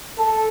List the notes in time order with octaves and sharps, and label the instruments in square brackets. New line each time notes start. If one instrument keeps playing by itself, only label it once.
[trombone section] A4